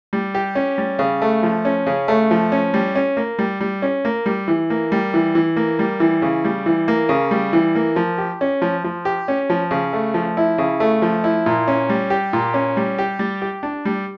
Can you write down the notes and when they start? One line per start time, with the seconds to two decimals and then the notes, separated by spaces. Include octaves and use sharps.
0.13 G3
0.35 G4
0.55 C#4
0.78 G3
0.99 C#3
1.22 A3
1.43 F3
1.65 C#4
1.87 C#3
2.08 A3
2.31 F3
2.52 C#4
2.74 G3
2.95 C#4
3.17 A#3
3.39 G3
3.61 G3
3.82 C#4
4.05 A#3
4.26 G3
4.48 E3
4.70 A#3
4.92 G3
5.14 E3
5.35 E3
5.56 A#3
5.79 G3
6.00 E3
6.22 C#3
6.45 G3
6.66 E3
6.88 A#3
7.09 C#3
7.31 G3
7.53 E3
7.75 A#3
7.96 F3
8.18 G4
8.41 C#4
8.62 F3
8.84 F3
9.05 G4
9.28 C#4
9.50 F3
9.71 C#3
9.93 A3
10.14 F3
10.37 E4
10.58 C#3
10.80 A3
11.02 F3
11.24 E4
11.46 A#2
11.68 C#4
11.89 G3
12.10 G4
12.33 A#2
12.54 C#4
12.77 G3
12.98 G4
13.19 G3
13.42 G4
13.63 D4
13.85 G3